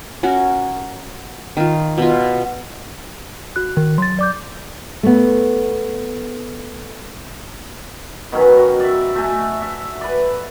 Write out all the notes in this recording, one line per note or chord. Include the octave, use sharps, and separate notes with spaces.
C#4 F#4 A#4
D#3 F4
B2 F4
F#4 F#6
D#3
F#3 C6 A6
D5 D6 G6
A3 B3
B2 D#3 F#3 C#4
F#4
D5 E5
A3 F#4 E5 G#5
E5
B4 D5